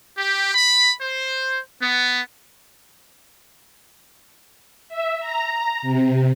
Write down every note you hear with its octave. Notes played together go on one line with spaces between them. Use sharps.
G4
B5
C5
B3
E5
A#5
C3